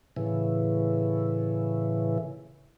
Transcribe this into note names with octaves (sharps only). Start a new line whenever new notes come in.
A2 C#3 E3